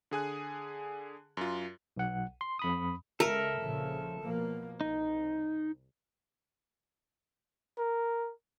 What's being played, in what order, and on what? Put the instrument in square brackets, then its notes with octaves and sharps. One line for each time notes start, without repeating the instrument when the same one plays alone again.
[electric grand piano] D3 G#4 G#5 F#6
F#2 F4
[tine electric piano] B1 F#5
C6
F2 B5 D#6
[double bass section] C#2 [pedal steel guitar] A4 E5 [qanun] A#4
[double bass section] A#1 C#3 F3
B2 F3 A#3
[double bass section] C2 [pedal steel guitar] D#4
[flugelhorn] A#4